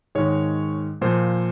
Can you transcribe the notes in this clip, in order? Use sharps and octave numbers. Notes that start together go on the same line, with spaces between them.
G#2 D#3 G#3 C#5
A#2 F3 A#3 C5